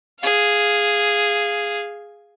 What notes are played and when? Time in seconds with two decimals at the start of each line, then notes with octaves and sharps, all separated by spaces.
0.20 G#4 F5